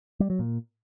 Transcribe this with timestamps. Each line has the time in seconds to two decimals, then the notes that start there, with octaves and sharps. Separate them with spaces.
0.20 G3
0.30 F#3
0.39 A#2